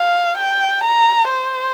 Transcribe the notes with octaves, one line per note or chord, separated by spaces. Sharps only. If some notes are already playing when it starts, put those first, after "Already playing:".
Already playing: F5
G5
A#5
C5